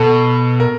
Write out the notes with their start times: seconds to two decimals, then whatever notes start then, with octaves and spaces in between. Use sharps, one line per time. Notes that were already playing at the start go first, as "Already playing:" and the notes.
Already playing: B2 A4
0.60 A#4